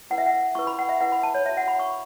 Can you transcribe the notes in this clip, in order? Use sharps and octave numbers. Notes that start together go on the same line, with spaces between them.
E4 B4 F#5
E5
F#5
E4 B4 C#6
B5
F#5
E5
E4 B4 F#5
B5
A5
C#5
F#4 C#5 E5
F#5
B5
C#6